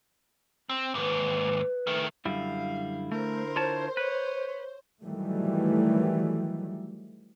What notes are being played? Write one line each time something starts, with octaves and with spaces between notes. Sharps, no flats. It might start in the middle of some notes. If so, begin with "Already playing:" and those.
C4
D#2 G#2 B4
D#3 A3
F#2 D3 G3 E4 F5
A3 A#4 C5
F4 C#5 A5
B4 C#5
D#3 E3 F#3 G3 A3